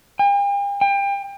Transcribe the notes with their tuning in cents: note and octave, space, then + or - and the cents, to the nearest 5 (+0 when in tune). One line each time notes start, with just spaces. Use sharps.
G5 +45
G5 +30